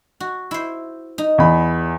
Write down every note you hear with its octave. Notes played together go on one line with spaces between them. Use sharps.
F#4
E4 C5
D#4
E2 B5